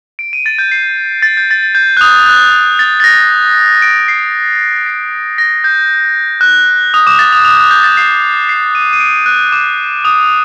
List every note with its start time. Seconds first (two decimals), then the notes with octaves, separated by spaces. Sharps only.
0.19 D7
0.33 D#7
0.46 A6
0.59 G6
0.71 C7
1.22 A6
1.37 G6
1.51 A6
1.63 A6
1.75 G6
1.97 F#6
2.01 D#6
2.26 F#6
2.79 A6
3.00 A6
3.04 A#6
3.82 D7
4.08 C7
4.86 C7
5.38 A#6
5.64 G6
6.41 F#6
6.94 D#6
7.07 D6
7.19 A6
7.32 D#6
7.45 D#6
7.57 F#6
7.71 G6
7.84 A6
7.97 C7
8.49 C7
8.75 D#7
8.93 D#7
9.00 D7
9.26 F#6
9.52 D6
10.05 D#6